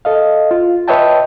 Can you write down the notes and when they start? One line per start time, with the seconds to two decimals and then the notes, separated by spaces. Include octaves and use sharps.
0.05 A4 D#5 F5
0.51 F4
0.88 B4 C#5 D#5 E5 G5 A5